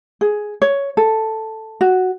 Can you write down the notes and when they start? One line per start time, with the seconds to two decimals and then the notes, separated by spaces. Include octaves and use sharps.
0.21 G#4
0.62 C#5
0.97 A4
1.81 F#4